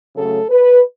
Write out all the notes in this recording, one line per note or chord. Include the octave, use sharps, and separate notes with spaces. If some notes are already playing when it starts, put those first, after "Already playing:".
C#3 F#3 A3 A4
B4